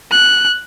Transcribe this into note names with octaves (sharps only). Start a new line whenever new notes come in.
F#6